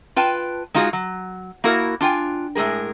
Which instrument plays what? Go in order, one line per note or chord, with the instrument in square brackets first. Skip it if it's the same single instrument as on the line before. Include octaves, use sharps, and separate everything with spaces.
[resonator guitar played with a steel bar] F4 B4 G5 A5
G#3 D#4 F4 F#4 G#4
F#3
A#3 E4 F#4 A#4
D4 F4 G5 G#5
A2 E3 G#3 G#4 A#4